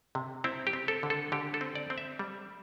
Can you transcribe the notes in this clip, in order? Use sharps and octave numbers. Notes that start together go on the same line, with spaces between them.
C3
C4 E4
G4
C4
A4
D3
A4
D3 G4
A4
C4
D5
C4
E5
G3